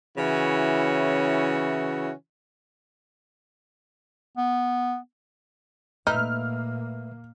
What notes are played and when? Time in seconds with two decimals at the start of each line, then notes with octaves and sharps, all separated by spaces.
0.18 C#3 E3 C#4 E4 F#4
4.37 B3
6.07 A#2 A3 A#3 D#4 B4 E5 F6